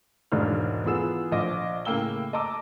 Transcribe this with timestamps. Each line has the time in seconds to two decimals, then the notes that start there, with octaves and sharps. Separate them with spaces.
0.32 E1 G#2 D4 D#4 F6
0.85 E3 B3 F4 G#4 E6 E7
1.32 A#1 D#5 D6
1.85 A2 C#3 A#3 G5 E6 G7
2.33 D#5 A5 A#5 D6 E6